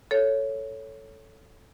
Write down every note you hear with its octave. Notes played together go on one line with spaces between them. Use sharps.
A4 C#5